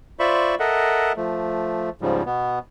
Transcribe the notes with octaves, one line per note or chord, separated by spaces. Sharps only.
F4 C5 D5 E5 B5 C#6
A4 A#4 D#5 E5 F#5
F3 A3
G#2 C#3 F3 G3
B2 B3